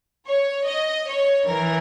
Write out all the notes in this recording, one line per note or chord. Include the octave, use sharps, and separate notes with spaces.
C#5
D#5
C#5
E3 A#4